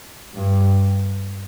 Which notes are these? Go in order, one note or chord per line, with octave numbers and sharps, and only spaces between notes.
G2